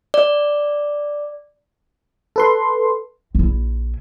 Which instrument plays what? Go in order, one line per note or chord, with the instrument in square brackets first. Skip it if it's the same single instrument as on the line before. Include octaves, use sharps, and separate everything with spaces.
[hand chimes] D5
[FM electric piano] A4 B4 C6
[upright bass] A#1 E4